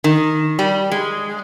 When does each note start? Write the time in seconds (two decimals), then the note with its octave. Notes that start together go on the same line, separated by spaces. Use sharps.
0.04 D#3
0.59 G3
0.92 G#3